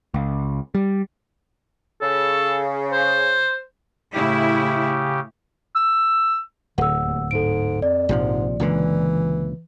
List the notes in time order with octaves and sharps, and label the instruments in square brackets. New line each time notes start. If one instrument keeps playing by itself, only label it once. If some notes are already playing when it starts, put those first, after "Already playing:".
[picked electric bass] C#2
G3
[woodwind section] C#3 [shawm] A4
[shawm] C5
[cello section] A2 E4 [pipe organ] C#3 G4
[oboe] E6
[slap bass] D1 [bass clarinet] D3 [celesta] F#5 E6
[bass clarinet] D#2
[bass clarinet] G#2 [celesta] A4 D7
[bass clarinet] F2 [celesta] D5
[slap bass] A#1 C3 F3 [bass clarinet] G#2
[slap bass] C#2 A#2 D3 [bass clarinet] E3